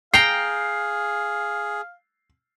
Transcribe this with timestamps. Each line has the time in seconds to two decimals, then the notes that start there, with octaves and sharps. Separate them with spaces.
0.14 G#4 F5 G5 A#5 C7